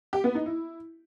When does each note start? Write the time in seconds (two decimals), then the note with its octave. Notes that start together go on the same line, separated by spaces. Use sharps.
0.13 G4
0.24 B3
0.35 D#4
0.46 E4